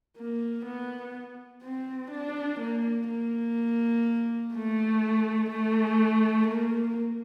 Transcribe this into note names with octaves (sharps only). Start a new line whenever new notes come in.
A#3
B3
C4
D4
A#3
A#3
A3
A3
A#3